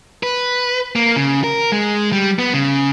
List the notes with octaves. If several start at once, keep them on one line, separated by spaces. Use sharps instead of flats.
B4
A#3
C#3
A#4
G#3
G3
B3
C#3